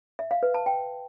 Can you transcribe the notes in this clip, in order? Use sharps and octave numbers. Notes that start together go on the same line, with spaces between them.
E5
F5
B4
A5
G5